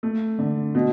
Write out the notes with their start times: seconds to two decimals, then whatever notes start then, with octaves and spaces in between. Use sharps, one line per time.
0.03 A3
0.39 D3
0.75 B2